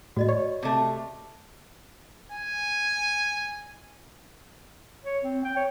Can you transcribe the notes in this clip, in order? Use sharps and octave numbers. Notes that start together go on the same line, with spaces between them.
A2 F#4 D5 D#5
C#5
C3 A3
G#5
C#5
C4
G5
C#5